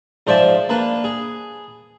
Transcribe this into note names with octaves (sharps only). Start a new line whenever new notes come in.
G#2 F3 C5 D5 E5 D6
A#3 D4 B4
G#4